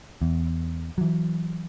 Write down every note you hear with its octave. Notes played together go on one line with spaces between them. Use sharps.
E2
E3 F#3